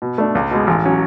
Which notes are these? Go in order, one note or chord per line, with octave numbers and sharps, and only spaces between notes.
B2
A3 D4
C#2
B2 G#3
A1
F#3 C#4